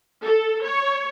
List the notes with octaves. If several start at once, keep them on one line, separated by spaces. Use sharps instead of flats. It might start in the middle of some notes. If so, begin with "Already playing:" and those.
A4
C#5